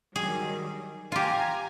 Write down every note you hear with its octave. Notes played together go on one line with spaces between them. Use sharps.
D#3 F#3 G3 G#4
F4 G4 G#5 A#5